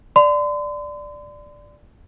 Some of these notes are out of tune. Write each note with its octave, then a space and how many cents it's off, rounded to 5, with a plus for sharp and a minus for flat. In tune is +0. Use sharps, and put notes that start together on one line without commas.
D5 +0 C6 -40